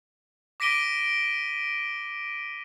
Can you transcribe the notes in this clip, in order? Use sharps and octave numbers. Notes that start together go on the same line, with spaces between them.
D6 A#6 B6 D7 D#7 G7